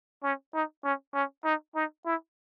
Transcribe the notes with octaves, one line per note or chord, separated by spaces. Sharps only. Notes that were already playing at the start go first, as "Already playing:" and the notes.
C#4
D#4
C#4
C#4
D#4
D#4
E4